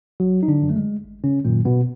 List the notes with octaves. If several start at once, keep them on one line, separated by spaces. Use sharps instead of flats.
G#1 F#3 F#4
D#4
D3 D4
F#2 D#3 F#3
A3
G#3
G#1
C#3 C#4
F#2 A#2 D#3 F#3 A#3
B2 B3